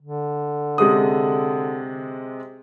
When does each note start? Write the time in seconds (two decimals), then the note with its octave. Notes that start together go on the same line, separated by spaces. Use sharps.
0.02 D3
0.78 C3 G#3 D#6